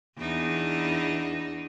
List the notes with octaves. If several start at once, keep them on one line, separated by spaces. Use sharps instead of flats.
E2 D4 D#4